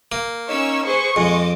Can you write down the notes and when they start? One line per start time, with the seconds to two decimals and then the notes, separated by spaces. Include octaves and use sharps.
0.12 A#3
0.49 C#4 D#4 C#5 E6
0.86 G#4 B4 C5 C#6
1.16 F2 G#3 D#5 D6